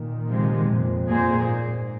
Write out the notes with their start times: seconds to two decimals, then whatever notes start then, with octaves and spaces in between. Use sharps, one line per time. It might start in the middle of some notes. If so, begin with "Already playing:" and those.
Already playing: A#2 D#3
0.29 C3 F3 G#3
0.68 F2 A#2
1.09 F2 A#2 A#3 G#4 C5
1.48 G#2